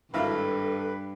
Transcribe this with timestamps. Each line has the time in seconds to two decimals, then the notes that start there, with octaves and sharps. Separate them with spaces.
0.14 G#1 G2 E4 A4 B4 F5